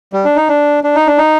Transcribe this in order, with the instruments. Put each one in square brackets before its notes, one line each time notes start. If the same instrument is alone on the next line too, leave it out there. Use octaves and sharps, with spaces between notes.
[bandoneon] G3
D4
D#4
D4
D4
D#4
D4
D#4